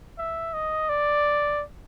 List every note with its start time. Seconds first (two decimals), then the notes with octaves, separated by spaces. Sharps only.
0.18 E5
0.54 D#5
0.89 D5